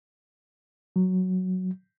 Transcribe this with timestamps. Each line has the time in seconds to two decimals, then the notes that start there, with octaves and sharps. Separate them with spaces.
0.96 F#3